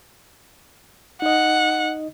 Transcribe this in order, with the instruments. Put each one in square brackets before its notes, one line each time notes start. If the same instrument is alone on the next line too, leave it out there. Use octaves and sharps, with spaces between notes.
[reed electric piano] D#4 D#5 [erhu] F#5